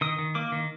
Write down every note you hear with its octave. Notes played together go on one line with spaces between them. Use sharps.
D#3 D#6
D#3
A#3 D6
D#3